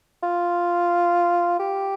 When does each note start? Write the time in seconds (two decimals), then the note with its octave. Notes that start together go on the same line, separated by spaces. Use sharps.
0.23 F4
1.59 G4